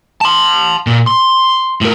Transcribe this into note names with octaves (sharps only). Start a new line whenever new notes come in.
A5 C6
A#2
C6
A2 A#4